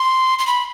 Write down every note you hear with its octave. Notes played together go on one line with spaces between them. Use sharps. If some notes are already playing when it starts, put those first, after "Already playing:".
Already playing: C6
C6
B5